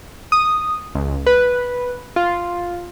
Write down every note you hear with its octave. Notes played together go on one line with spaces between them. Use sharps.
D#6
C#2
B4
F4